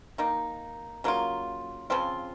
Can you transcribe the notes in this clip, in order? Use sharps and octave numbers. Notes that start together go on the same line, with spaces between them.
D#3 A#3 D#4
C#3 F#3 A#3 F4
C#3 F3 C4 F4